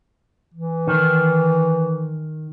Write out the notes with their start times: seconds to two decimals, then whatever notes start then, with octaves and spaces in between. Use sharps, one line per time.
0.54 E3
0.88 D#3